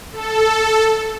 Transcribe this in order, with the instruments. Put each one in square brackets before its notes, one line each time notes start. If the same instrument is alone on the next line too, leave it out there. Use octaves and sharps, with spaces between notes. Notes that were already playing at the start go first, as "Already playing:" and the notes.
[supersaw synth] A4